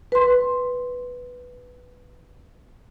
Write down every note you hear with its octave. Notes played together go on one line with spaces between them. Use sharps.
B4 C6